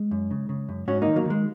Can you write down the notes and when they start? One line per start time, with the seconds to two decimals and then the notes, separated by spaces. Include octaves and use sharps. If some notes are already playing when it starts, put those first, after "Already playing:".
Already playing: G#3
0.11 F#2
0.31 C#3
0.49 C#3
0.69 F#2
0.88 G#2 C#4 F#4
1.02 D#3 A#3 D#4
1.16 F#3 A#3
1.25 D#3 G#3